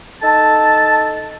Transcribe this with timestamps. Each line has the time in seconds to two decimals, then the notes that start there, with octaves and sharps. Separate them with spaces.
0.22 D#4 A4 A5